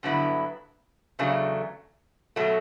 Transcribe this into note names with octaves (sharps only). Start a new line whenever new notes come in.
G2 D3 F#3 B3 E4
E2 C#3 F#3 A3 D4
B2 F#3 A3